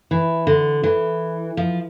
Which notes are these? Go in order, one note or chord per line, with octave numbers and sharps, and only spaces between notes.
E3
D3
E3
F3